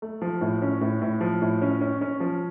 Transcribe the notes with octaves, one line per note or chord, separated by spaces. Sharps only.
A3
F3
A2
C#4
A2
A2
F3
A2
C#4
C#4
C#4
F3